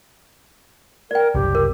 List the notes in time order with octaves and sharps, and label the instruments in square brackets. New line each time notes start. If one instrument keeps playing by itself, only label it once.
[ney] A#4 [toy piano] D5 G5
[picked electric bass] F#1 C2 [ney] G4
[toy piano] A#4